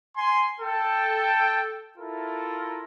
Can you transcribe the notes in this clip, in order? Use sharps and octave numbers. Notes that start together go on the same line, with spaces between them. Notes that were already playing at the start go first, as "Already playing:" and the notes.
G#5 C6
A4 G5
E4 F4 A4 A#4